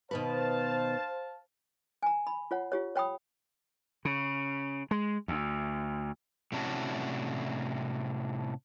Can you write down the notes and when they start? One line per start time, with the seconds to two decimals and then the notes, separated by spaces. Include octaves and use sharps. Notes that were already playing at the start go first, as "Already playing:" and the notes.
0.11 B2 D#3 B4 C5 F5 A5
2.03 G#5 A#5
2.27 B5
2.51 F4 C#5 F#5
2.72 F4 G4 C#5
2.96 C#5 G5 B5 D#6
4.05 C#3
4.91 G#3
5.28 D2
6.52 A2 C3 C#4 D4 E4 F#4